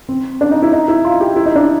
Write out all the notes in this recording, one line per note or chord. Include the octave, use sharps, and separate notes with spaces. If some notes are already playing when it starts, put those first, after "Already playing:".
C4
D4
D#4
E4
D#4
E4
F4
G4
E4
D#4
D4